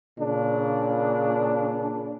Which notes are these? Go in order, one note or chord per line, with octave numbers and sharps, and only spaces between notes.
A#2 C#3 D4